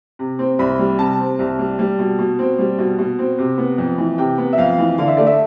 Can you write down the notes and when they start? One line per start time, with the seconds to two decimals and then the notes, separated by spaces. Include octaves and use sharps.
0.19 C3
0.39 C4
0.59 C2 B5
0.79 G3
0.99 C3 A5
1.19 C4
1.39 C2
1.59 G3
1.79 G3
1.99 B2
2.19 B2
2.39 C4
2.59 G3
2.78 B2
2.99 B2
3.19 C4
3.38 C3
3.58 B3
3.78 F2
3.98 E3
4.18 C3 G5
4.38 B3
4.53 E5
4.58 F2 F5
4.78 E3
4.98 D3 F5
5.08 E5
5.17 A3 D5
5.27 E5